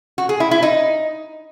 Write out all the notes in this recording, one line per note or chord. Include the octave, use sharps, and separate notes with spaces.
F#4
G#4
E4
E4
D#4